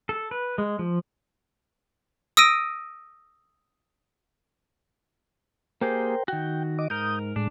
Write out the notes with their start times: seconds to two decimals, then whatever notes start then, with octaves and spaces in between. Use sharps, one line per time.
0.09 A4
0.31 B4
0.58 G#3
0.79 F3
2.37 D#6 E6 A#6 D7 D#7
5.81 A#3 G4 G#4 A#4 C5 G5
6.28 D#3 F#4 G5
6.79 D#5 D6
6.90 G#2 A#4 D#6 G6
7.36 A2 G#3 D4